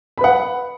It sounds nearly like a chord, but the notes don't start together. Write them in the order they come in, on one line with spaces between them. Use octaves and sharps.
B5 B4 F#5